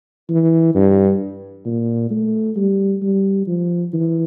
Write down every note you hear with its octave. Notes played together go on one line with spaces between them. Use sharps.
E3
G2
A#2
A3
G3
G3
F3
E3